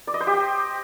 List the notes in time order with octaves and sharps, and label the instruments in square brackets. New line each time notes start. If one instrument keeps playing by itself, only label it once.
[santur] D5
D#5
C5
G4
G5